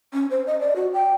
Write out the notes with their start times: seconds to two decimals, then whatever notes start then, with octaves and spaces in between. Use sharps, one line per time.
0.13 C#4
0.31 C5
0.47 D#5
0.60 D5
0.76 F#4
0.93 G5